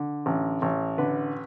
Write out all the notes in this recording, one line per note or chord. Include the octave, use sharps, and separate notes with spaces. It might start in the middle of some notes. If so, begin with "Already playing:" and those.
Already playing: D3
A1
A1
D3 B4